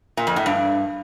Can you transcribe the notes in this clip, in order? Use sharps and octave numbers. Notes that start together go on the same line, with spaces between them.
A#2
F2
A2
G2